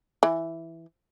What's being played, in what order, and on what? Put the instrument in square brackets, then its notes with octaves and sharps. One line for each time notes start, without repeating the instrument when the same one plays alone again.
[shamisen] E3